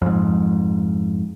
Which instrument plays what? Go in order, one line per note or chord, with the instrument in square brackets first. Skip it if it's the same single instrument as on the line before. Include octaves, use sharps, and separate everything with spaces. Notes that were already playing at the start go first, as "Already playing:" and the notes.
[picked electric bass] F2 G#2